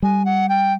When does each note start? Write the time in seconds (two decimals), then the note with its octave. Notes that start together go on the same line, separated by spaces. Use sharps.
0.02 G3 G#5
0.25 F#5
0.49 G5